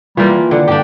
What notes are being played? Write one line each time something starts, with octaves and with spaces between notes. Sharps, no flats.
E3 G3 A#3 F4
D#3
D3
G2 D4 G4